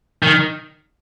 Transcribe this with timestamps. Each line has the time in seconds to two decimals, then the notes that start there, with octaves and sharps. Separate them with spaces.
0.23 D#3